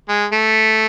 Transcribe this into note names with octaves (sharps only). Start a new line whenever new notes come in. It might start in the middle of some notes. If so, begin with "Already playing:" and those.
G#3
A3